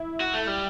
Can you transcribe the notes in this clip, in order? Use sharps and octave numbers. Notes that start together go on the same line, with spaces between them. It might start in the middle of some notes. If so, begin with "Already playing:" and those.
Already playing: E4
F#4
A3
G3